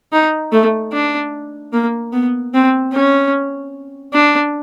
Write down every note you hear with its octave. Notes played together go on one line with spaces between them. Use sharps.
D#4
A3
D4
A#3
B3
C4
C#4
D4